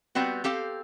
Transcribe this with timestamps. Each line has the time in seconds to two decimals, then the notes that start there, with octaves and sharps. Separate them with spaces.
0.15 G3 B3 C4 F#4
0.44 C4 G4 A4 F5